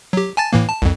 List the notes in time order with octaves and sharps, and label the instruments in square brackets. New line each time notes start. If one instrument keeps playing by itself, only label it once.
[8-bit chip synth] F#3 G4
G#5 A5 A6
A2 E3 A#3
A5
C2 F2